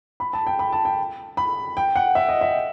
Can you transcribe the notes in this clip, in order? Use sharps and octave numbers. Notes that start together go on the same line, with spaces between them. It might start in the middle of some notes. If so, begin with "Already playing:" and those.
B5
A5
G5
B5
A5
G5
B5
G5
F#5
E5
D#5
E5